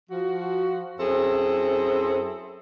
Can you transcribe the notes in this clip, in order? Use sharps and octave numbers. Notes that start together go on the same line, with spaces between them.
F3 F#4
F#2 C4 E4 G#4 A4